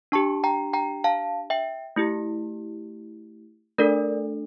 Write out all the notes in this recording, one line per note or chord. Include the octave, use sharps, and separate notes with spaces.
D4 G4 A5 C#6
G5 A#5
G5 A#5
F5 A5
E5 G5
A3 E4 G4
A3 D4 A4 A#4 D5